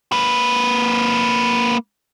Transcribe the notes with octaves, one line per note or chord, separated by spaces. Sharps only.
A#3 B4